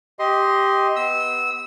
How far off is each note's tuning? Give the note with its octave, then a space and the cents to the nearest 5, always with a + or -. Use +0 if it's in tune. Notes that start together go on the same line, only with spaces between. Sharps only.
G4 +0 D#5 +15 C6 +0
B3 +0 E6 -20